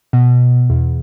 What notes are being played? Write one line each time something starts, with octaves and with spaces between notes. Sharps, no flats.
B2
E2